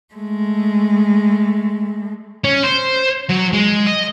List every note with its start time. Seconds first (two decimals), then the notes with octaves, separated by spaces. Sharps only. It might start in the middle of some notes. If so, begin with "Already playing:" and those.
0.15 G#3 A3
2.44 C#4
2.63 C5
3.30 F#3
3.53 G#3
3.86 D#5